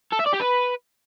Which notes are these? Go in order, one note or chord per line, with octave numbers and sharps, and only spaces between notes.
A4
E5
D5
G4
B4